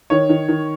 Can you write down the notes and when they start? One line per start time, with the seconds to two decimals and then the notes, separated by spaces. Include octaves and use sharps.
0.10 D#3 C#5
0.29 D#3
0.48 D#3